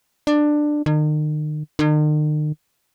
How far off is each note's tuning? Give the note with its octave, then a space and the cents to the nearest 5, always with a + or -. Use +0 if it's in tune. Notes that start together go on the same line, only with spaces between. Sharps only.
D4 +15
D#3 -40
D#3 -45